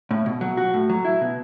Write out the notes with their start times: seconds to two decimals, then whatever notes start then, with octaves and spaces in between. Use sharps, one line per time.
0.11 A2
0.26 B2
0.41 F#3
0.57 F#4
0.74 A2
0.90 F#3
1.05 E4
1.21 B2